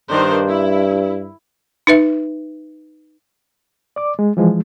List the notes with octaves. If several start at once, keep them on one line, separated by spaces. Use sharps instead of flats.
G2 D#3 D4 C5
E4
D#4 B4 E5
D5 D6
G#3
E3 F3 G#3